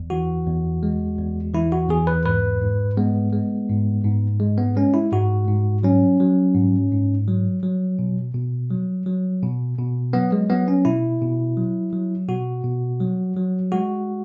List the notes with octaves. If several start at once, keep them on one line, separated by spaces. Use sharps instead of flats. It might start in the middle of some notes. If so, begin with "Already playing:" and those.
Already playing: E2
E3 F#4
E2
G#3
E2
E3 E4
F#4
E2 G#4
B4
G#2 B4
G#2
G#3 B3
G#3
G#2
G#2
G#3
B3
G#3 C#4
E4
G#2 F#4
G#2
F#3 C#4
F#3
G#2
G#2
F#3
F#3
B2
B2
F#3
F#3
B2
B2
F#3 B3
G#3
F#3 B3
C#4
B2 E4
B2
F#3
F#3
B2 F#4
B2
F#3
F#3
G#3 F#4